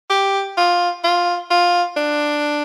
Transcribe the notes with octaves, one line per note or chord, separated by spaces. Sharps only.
G4
F4
F4
F4
D4